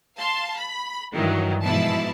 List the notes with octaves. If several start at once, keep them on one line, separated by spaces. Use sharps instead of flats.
F5 A5 C6
B5
G2 D#3 E3 F#3
G#2 B2 E3 F3 E4 A5